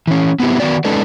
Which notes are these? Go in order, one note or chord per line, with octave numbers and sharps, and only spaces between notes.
E3 C#4
B3 C4 E4 G4
D#3 B3 F#4 D5
G#3 C#4 D#4 A4 B4 D5